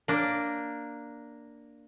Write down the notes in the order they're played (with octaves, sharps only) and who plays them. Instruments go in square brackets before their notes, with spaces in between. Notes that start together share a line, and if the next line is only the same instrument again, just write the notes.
[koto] A#3 D4